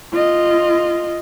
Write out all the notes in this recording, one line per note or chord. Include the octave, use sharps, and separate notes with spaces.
F4 D#5